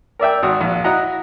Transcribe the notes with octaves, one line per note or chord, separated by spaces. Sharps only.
A#4 D5 E5 G5
G#1 F#4 D#6
A#1
E4 F#4 D#5 F#5 A#5